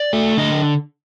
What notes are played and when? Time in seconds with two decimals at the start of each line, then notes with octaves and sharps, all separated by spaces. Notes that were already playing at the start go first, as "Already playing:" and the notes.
Already playing: D5
0.13 A3
0.38 D3 D#5